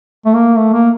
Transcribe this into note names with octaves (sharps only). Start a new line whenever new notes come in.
A3
A#3
A3
A#3